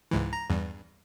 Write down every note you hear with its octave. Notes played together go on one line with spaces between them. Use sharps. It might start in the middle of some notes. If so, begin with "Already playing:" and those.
C#2 G#2 E3
A#5
E2 G2